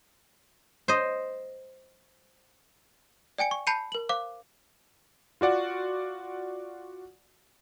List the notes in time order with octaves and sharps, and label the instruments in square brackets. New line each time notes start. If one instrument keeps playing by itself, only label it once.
[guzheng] C5 D#5
[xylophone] D5 G5 G#5 C#7
C#6
A5 B5 G6 C7 C#7 D#7
A#4 F#7
C5 F5 D6
[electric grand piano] F4 F#4 D5 F#5